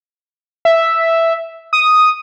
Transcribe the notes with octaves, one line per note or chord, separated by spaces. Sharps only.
E5
D#6